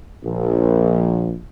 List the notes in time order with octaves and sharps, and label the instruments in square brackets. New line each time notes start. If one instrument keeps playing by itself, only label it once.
[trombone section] A#1